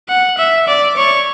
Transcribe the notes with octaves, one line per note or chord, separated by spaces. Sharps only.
F#5
E5
D5
C#5